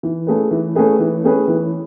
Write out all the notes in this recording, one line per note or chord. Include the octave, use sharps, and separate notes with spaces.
E3
A3 C#4 G#4 B4
E3
A3 C#4 G#4 B4
E3
A3 C#4 G#4 B4
E3